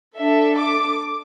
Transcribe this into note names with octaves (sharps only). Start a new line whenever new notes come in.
D4 A4 E5
D6